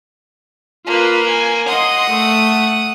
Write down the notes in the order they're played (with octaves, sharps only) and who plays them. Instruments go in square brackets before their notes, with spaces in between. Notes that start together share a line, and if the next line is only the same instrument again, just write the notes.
[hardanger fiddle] A#3 [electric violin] F4 B4
[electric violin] G#5
[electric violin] D#5 C6 [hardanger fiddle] F#5 D#6
[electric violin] A3